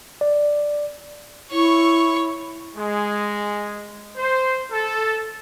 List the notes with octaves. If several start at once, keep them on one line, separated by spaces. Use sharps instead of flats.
D5
E4 C#5 C#6
G#3
C5
A4